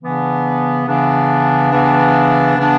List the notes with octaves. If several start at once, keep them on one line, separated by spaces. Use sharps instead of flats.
C#3 E3 B3 D4
C#3 E3 B3 D4
C#3 E3 B3 D4
C#3 E3 B3 D4